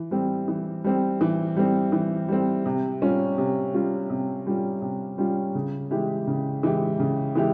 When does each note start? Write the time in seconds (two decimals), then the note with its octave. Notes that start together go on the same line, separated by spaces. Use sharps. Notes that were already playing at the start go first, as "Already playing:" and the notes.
Already playing: E3
0.11 G3 C4
0.48 E3
0.84 G3 C4
1.21 E3
1.56 G3 C4
1.92 E3
2.28 G3 C4
2.66 C3
3.02 G3 C#4 F4
3.38 C3
3.74 G3 C#4 F4
4.10 C3
4.46 G3 C#4 F4
4.82 C3
5.18 G3 C#4 F4
5.55 C#3
5.91 E3 G#3 E4 G4
6.27 C#3
6.63 E3 G#3 E4 G4
6.99 C#3
7.35 E3 G#3 E4 G4